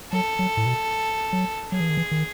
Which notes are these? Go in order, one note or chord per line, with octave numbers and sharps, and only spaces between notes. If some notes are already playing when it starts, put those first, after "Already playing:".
F#3 A4
F#3
A2
B2
F#3
F#3 G#4
E3
D#3
E3
D#3